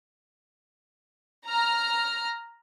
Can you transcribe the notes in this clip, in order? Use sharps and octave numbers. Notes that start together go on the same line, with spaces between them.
A#5 F6